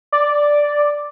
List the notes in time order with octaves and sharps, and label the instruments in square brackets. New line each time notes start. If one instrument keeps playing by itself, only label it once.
[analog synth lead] D5